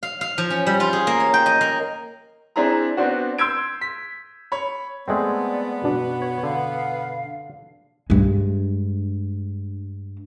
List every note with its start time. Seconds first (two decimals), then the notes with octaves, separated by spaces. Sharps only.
0.03 F5
0.21 F5
0.38 F3
0.50 C#4
0.67 G3
0.80 F4
0.93 G#4
1.07 A#3
1.20 C#5
1.34 G5
1.46 D#5
1.61 A#3
2.56 C4 D4 E4 G#4 A#5
2.97 B3 C4 D4 F#4
3.38 C6 E6 G6 G#6 D7
3.81 B6
4.52 C#5 B5
5.08 G#3 A3 B3 C4 D5
5.82 F#2 B2 D4 F#4
6.22 C#5
6.43 D3 F5
8.10 G2 G#3